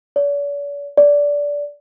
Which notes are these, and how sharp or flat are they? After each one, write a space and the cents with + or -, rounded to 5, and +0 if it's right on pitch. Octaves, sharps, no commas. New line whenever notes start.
D5 -45
D5 -15